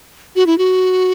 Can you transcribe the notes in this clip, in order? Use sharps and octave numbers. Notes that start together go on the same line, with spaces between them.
F#4
E4
F#4